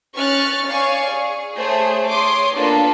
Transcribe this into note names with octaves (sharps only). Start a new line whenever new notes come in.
C#4 C#6 F6 F#6 A6
C#5 D5 F5 G#5 C#6
G#4
A3 G#4 C5 C#5
C#5 C6 D6 D#6
A#3 B3 D4 F4 A4 B4